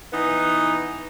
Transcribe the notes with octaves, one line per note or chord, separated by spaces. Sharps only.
E3 B3 D#4